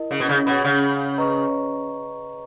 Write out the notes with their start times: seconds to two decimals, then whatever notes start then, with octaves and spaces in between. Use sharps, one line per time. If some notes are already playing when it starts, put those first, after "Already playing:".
Already playing: E4 A#4 D#5
0.11 C#3
0.20 B2
0.29 C#3
0.46 B2 G#4 C#5 F#5 B5
0.64 C#3
1.18 B4 D#5 A#5 C#6